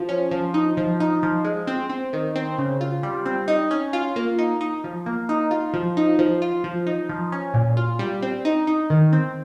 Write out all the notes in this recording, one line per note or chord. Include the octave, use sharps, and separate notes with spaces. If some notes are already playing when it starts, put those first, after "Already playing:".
Already playing: F3
C#4
F3
D#4
F3
D#4
F3
G#3
C4
C4
D#3
C4
C#3
F4
G3
C4
D#4
C#4
F4
A#3
D#4
D#4
F3
A#3
D#4
F4
F3
D#4
F3
F4
F3
D#4
F3
C#4
A#2
F4
G3
C4
D#4
D#4
D#3
C4